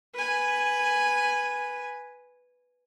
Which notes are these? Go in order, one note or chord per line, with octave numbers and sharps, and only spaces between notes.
B4 G#5